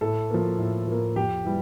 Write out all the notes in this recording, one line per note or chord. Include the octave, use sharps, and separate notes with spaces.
A2 A4
F3 A#3
A2
F3 A#3
F2 G4
E3 G3